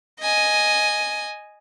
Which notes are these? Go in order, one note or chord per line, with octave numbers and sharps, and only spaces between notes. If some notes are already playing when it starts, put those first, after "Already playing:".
D#5 G#5